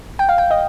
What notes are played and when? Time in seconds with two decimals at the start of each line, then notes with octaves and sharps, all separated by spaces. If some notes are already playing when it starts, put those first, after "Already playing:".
0.19 G5
0.29 F5
0.38 G5
0.51 D#5